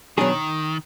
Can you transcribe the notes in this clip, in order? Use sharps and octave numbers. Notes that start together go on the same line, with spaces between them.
B2 D#3 F#3 D4 G#4